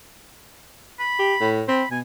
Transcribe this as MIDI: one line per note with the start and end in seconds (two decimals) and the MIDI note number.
0.99 1.52 83
1.19 1.34 67
1.41 1.63 45
1.68 1.83 60
1.68 1.88 83
1.91 2.02 47
1.91 1.99 80